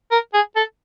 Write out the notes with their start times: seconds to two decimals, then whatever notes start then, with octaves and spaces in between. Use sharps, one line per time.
0.11 A#4
0.34 G#4
0.56 A4